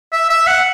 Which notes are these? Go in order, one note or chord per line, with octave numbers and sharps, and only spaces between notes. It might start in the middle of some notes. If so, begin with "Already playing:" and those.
E5
E5
F#5